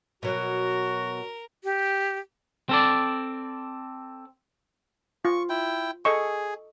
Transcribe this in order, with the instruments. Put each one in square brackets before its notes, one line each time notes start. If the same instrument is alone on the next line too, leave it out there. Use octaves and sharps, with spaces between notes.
[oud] B2 F#3 [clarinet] F#4 [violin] A#4
[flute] G4
[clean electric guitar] C4 A4 D5
[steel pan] F4 [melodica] C#6
[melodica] E4 G5
[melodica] G#4 [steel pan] A4 D#5 C#6